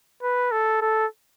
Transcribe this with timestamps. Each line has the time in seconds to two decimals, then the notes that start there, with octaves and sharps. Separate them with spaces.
0.23 B4
0.52 A4
0.81 A4